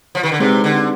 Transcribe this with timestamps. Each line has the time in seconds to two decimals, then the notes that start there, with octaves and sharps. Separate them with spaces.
0.15 F3
0.23 D#3
0.32 D3
0.40 C3 G#3 C4 D#4 G#4 B4
0.64 D3